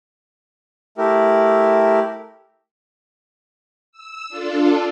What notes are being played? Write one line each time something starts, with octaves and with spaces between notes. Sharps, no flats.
A3 E4 G4 A#4
E6
D4 F4 A4